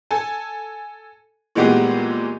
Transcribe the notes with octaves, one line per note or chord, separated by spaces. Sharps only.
A4 G#5
A#2 E3 G#3 A3 B3 G4